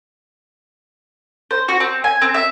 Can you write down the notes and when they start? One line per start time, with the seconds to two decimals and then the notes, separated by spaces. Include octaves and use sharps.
1.51 C5
1.68 F#4
1.80 C4
2.04 G#5
2.22 C4
2.34 E5